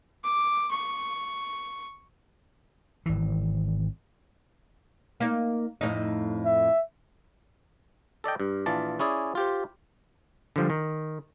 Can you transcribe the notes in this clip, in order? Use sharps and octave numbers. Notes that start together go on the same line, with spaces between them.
D6
C#6
G#1 E3
A#3 D#4
F2 A2 D#4
E5
A4 D5 D#5 G5
G2
A#1 E3 F4 D5 A5
C#4 E4 G#4 D5
F4 G4 C5
D3 F3 G3
D#3